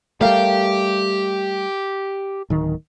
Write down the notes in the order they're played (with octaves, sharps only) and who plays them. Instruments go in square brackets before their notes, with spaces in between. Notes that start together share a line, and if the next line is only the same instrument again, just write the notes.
[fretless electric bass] G3 A3 [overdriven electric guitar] G4 [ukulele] A#4 F5
[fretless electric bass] D1 D#3